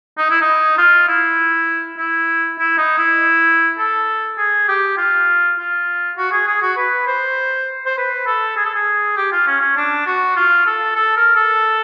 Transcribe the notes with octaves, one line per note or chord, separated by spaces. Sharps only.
D#4
E4
D#4
F4
E4
E4
E4
D#4
E4
A4
G#4
G4
F4
F4
F#4
G#4
G#4
F#4
B4
C5
C5
B4
A4
G#4
A4
G#4
G4
F4
C#4
C#4
D4
F#4
F4
A4
A4
A#4
A4